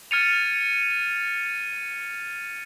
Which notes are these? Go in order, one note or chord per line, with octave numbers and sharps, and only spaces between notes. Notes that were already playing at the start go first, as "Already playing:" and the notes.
F6 G#6 A6 C#7 D#7 F7